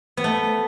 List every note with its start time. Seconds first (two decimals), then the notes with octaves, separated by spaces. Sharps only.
0.17 B3
0.24 A3